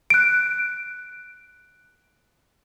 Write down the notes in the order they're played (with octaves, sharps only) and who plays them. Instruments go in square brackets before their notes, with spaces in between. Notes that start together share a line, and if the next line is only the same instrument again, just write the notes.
[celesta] F#6 D7